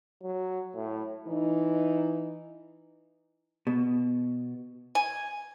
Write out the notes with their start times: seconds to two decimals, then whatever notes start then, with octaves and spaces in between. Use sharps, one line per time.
0.23 F#3
0.75 A2
1.27 E3 D#4
3.67 B2
4.95 G#5